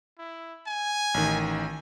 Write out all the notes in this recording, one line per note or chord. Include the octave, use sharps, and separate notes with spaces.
E4
G#5
A1 D#3